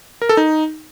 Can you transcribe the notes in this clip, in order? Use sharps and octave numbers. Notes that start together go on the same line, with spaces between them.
A#4
A4
D#4